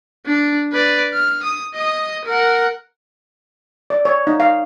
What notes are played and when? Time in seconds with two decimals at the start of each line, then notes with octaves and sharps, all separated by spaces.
0.26 D4
0.72 B4 D5
1.13 F6
1.43 D#6
1.74 D#5 D#6
2.25 A#4 F#5
3.90 D5
4.05 C#5
4.27 D#4
4.40 F5